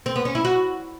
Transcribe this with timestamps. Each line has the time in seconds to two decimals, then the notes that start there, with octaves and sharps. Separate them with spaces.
0.06 C4
0.16 B3
0.25 C#4
0.35 E4
0.45 F#4